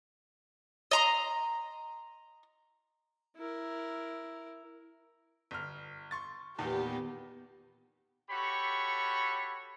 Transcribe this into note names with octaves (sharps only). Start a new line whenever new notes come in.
D#5 A#5 C6
E4 A#4
G1 F6
C6 C#6 A6
E2 A#2 D#3 B3 G4
F#4 G4 A4 C#5 B5 C#6